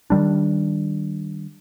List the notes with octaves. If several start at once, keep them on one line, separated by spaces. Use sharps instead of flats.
D#3 G3 D4